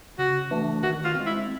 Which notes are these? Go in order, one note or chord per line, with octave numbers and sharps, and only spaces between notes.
C#3 F#4
E3 A3 D4
D#3 F#4
F4
G#3 C4
E4